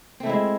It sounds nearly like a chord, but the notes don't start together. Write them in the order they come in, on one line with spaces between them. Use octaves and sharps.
C4 A3 E4 G#3